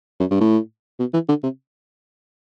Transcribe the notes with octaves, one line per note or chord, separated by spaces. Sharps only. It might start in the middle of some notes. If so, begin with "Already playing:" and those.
F#2
G2
A2
B2
E3
D3
C3